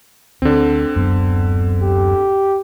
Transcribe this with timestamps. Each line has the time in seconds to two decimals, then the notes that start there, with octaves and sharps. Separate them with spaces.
0.42 D2 D3 C4
0.96 D1 F#2 B3
1.83 G4